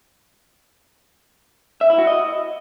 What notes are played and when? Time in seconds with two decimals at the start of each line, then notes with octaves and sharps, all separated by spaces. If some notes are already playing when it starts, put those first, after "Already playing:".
1.81 E5
1.90 E4
1.98 F#4
2.07 D#5